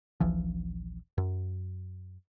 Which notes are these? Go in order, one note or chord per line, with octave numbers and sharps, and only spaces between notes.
D#1 A#1 E3 F3
F#2